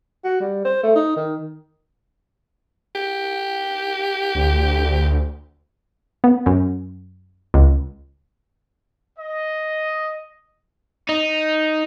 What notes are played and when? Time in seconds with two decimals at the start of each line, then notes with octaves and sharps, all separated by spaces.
0.25 F#4
0.41 G3
0.65 C5
0.83 A3
0.95 D#4
1.16 D#3
2.95 G4
4.35 D2
6.24 B3
6.46 F#2
7.54 C#2
9.18 D#5
11.09 D#4